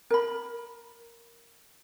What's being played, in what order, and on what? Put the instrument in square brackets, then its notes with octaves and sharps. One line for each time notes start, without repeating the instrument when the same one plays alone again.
[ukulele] A#4 B5